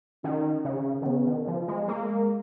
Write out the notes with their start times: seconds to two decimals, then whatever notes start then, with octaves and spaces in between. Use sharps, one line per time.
0.24 D#3 C#4
0.65 C#3
1.02 D#3
1.06 C#3 B3
1.26 D#3
1.47 F3
1.68 G#3
1.88 G#3 A#3